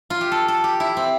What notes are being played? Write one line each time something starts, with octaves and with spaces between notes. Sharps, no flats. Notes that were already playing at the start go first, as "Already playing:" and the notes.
F4
G4
A4
A4
G4
E4
C4